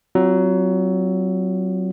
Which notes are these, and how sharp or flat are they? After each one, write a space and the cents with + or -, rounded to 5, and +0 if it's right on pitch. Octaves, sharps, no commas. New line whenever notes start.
F#3 +20 C4 +0 F4 +0